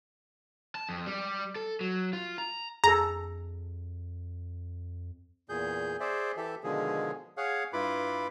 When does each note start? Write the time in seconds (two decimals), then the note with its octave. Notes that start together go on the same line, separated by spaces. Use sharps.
0.75 A5
0.89 F2
1.06 G3
1.56 A4
1.81 F#3
2.13 F4
2.38 A#5
2.84 F2 G#4 A4 A#5
5.49 E2 A#2 G#4 G6
6.00 G#4 C5 D5 E5
6.37 E3 G4 A4 E5
6.63 B2 D3 D#3 F3 G#3 G#4
7.37 G#4 C#5 F5 F#5
7.73 G2 E4 F4 B4 B5 D6